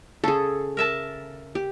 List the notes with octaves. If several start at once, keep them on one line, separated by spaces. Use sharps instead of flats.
C#3 G#4 A4
A#4 E5 A5
G4